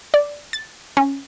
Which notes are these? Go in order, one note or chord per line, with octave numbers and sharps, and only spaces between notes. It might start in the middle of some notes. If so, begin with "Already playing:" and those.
D5
A6
C#4